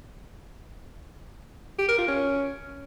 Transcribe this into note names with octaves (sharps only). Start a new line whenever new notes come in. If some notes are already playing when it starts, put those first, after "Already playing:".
G4
A#4
F4
C#4